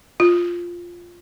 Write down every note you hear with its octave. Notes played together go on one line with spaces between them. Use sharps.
F4